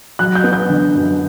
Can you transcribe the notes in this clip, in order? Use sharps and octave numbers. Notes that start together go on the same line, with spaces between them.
F#3 F#6
G6
B3
G6
D3
F#2